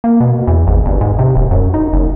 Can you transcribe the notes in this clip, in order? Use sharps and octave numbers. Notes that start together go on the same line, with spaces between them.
A#3
B2
E2
G#1
G1
G#2
C3
D#1
F#2
D#4
F#1